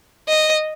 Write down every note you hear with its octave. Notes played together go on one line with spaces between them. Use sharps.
D#5